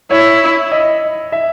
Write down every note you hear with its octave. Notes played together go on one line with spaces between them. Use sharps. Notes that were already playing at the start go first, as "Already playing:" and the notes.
E4 C#5
D#5
E5